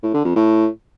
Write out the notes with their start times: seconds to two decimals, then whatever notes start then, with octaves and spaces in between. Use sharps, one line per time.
0.03 A2
0.14 D3
0.25 F2
0.36 A2